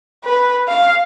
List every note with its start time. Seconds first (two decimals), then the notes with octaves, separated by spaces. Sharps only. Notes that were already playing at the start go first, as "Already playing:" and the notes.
0.25 B4
0.68 F5